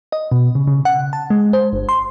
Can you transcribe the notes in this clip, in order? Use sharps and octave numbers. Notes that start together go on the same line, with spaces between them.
D#5
B2
C#3
C#3
F#5
A5
G#3
C5
G1
C6